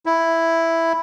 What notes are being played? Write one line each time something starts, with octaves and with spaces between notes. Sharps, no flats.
E4